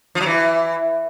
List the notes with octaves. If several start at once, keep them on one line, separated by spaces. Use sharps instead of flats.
F3
F#3
E3